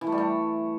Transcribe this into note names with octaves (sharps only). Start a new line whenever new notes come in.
E3
A3
G3
A3